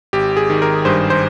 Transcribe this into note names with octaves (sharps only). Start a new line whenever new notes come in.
G#1 G4
G#4
D#3
A#4
G2 C5
C5